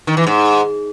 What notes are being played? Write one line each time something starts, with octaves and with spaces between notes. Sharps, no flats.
D#3
E3
G#2